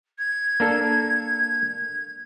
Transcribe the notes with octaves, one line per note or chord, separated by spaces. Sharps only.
G#6
A#3 D4 A4